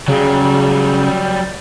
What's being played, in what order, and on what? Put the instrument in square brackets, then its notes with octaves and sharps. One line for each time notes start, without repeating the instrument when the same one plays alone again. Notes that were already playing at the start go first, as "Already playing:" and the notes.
[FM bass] C#3 [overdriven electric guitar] F#3 G3